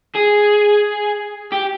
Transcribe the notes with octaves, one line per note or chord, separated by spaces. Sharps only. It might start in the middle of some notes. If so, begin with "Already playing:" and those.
G#4
G4